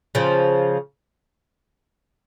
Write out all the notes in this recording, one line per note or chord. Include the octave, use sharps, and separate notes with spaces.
C#3 F3